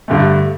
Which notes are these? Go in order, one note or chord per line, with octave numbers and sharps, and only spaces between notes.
G2 D3 A3